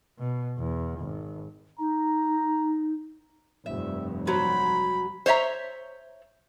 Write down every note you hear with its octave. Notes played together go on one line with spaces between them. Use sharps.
B2
E2
G#1
D#4 A#5
F1 G2 E5
F#3 C5 B5
C5 C#5 E5 A#5